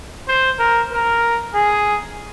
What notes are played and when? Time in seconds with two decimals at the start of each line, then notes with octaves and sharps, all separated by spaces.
0.28 C5
0.59 A#4
0.92 A#4
1.55 G#4